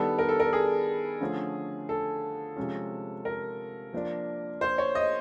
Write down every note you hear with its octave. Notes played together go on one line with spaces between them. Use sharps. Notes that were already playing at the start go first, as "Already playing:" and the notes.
Already playing: D#3 G3 B3 D4 A4
A#4
A4
A#4
G#4
D3 F3 A3 C#4
A4
C3 F3 G#3 C#4
A#4
F3 A#3 D4
C5
C#5
D#5